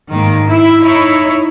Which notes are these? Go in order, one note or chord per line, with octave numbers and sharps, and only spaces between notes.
G#2 D#3 A#3
E4
D#4 E4 C#5